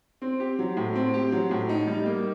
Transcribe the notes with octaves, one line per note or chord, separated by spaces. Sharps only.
C4
G4
F#3
A2
C4
G4
F#3
A2
D#4
G3
A#3